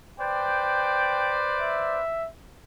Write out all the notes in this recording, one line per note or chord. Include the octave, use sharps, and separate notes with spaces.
B4 C5 D5 G5
E5